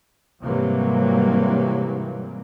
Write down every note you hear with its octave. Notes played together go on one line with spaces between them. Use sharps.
G#2 C3 E3 F#3 G3 A#3